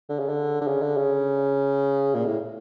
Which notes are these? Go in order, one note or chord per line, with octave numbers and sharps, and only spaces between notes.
D3
C#3
D3
D3
C#3
D3
C#3
A#2
A2